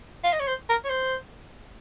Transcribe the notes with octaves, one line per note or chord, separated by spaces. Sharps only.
F5
D#5
C#5
C5
A#4
C#5
C5